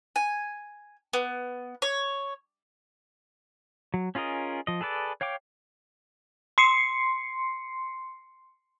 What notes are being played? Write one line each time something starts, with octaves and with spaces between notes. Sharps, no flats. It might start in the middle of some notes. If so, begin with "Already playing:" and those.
G#5
B3
C#5
F#3
C#4 F4 G#4 A#4 D#5
F3 D#5
G#4 A4 B4 D5
C#5 F5 G5 D6
C6 C7 C#7